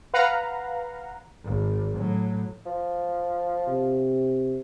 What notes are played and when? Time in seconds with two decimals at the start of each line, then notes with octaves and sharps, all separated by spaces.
0.14 B4 F5 F#5 A#5
1.44 G#1
1.96 A2 F#3
2.66 F3
3.68 C3